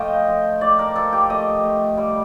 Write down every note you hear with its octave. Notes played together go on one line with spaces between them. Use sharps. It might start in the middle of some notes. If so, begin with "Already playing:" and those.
Already playing: F3 A3 D#5 F5 G5 A5
F3
A3 D5
A#4
F3 A4
G4
A3 D#5
A3
G3